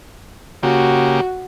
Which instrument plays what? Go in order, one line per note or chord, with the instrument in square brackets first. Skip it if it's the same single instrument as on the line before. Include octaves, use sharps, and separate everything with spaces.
[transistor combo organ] C#3 A#3 G4 [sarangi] F#4